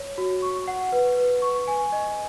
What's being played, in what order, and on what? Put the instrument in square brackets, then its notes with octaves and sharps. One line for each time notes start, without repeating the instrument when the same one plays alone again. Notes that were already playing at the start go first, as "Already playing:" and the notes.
Already playing: [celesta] C#5
F#4
C#6
F#5
B4
B4
C#6
G#5
D#5